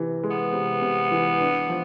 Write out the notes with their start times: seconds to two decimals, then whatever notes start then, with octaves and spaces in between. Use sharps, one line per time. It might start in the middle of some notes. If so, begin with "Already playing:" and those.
Already playing: C3 E3
0.23 G#3
0.30 B3
0.53 C3
0.82 C3
1.11 E3
1.40 D4
1.69 F3